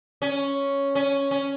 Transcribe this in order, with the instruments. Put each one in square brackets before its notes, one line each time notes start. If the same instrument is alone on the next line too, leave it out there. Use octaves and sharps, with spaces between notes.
[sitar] C#4
C#4
C#4